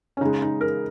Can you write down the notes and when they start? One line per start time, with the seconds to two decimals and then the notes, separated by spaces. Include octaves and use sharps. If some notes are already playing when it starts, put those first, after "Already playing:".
0.17 C#4
0.21 C#3 G#3 D#4
0.42 D#4
0.61 A#4